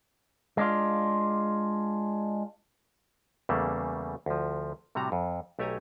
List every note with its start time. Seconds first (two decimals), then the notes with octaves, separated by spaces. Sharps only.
0.57 G#3 D4 F4
3.49 E2 C#3 G3 A3 A#3
4.26 D2 F3
4.95 A2 C3 G3 F#4 A#5
5.12 F2
5.59 B1 A3 G4 C#5 G#5 A#5